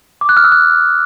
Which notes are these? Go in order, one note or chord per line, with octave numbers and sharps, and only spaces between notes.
D6
F#6
F6
E6
F#6